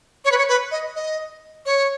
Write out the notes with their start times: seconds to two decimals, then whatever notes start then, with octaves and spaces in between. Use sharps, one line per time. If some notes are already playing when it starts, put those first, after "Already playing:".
0.25 C#5
0.32 B4
0.38 C#5
0.48 B4
0.71 D#5
0.95 D#5
1.66 C#5